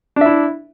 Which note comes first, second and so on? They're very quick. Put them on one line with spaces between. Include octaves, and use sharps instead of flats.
D4 E5 E4